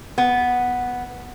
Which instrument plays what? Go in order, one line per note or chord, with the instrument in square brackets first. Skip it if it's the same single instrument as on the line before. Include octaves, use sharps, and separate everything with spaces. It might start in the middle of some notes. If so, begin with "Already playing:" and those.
[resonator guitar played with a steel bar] B3